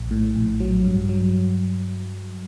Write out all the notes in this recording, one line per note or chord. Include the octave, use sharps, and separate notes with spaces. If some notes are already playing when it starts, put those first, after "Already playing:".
Already playing: A#1
A2
A#1
F#3
G2
F#3